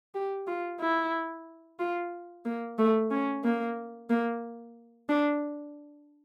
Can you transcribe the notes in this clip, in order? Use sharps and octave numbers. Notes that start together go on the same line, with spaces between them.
G4
F4
E4
F4
A#3
A3
C#4
A#3
A#3
D4